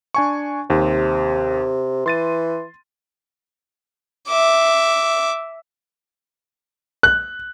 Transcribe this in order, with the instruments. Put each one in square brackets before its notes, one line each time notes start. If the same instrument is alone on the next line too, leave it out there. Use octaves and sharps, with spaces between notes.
[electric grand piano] D4 G#5 C#6
[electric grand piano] D#2 [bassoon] C3
[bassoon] E3 [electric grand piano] C6 A6 D#7
[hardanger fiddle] E5 D6
[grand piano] F#6